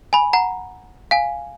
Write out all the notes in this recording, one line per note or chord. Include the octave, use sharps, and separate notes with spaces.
G#5 B5
F#5 A#5
F5 G#5